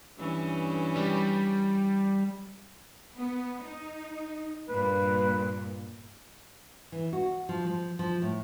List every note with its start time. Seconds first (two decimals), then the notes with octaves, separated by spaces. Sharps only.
0.17 G2 E3 C#4
0.96 G3
3.16 B3
3.63 D#4
4.69 G2 A#2 B4
6.92 E3
7.13 F#4
7.49 F3
7.67 F3
7.99 F3
8.22 A2